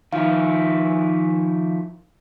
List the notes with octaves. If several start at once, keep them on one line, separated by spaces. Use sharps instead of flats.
D#3 F3 E4 F5